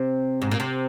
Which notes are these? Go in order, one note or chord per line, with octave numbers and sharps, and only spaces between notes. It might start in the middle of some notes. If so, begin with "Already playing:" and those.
Already playing: C3
G#2
A#2
C3